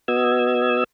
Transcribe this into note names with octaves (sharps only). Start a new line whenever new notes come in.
B3 F#4 D#5 E6 G#6